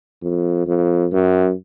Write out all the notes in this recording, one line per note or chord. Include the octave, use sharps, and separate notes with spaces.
F2
F2
F#2